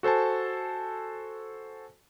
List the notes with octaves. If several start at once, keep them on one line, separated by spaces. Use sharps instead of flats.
F#4 A4 C5 G#5 A5